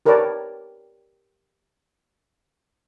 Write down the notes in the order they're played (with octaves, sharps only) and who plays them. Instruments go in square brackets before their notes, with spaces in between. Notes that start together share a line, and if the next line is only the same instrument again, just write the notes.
[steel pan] G4 A#4 B4 C#5 D5 A5